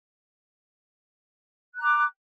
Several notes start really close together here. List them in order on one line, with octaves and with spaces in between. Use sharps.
F#6 A#5 D6